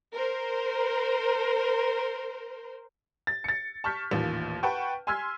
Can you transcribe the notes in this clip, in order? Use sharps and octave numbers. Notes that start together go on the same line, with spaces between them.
A#4 C5
A6
A6 C#7
A5 C#6 F6 G6 B6
A1 D#2 A#2
B4 F#5 G5 A5 C#6
G#5 C6 E6 F6 G#6 B6